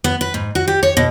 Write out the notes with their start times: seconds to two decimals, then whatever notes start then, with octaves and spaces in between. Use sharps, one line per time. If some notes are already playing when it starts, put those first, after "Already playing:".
0.04 B3
0.21 B4
0.34 G#2
0.55 F#4
0.68 G4
0.83 C#5
0.97 B2